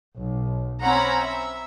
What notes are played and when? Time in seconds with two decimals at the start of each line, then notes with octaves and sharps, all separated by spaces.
0.16 B1
0.83 C4 C#4 F#5 A#5 B5
1.21 E5